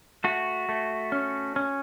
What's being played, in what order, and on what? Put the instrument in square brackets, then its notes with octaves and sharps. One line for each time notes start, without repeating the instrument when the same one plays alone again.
[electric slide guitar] A3 F#4
A3
C#4
C#4